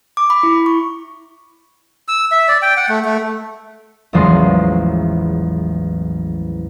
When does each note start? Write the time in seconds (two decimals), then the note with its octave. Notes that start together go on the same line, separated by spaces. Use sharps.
0.17 D6
0.30 B5
0.43 E4
0.66 C#6
2.08 E6
2.32 E5
2.48 D5
2.62 G5
2.77 F#5
2.89 A3
3.05 A3
4.13 A1 E2 F3 F#3 G#3 C6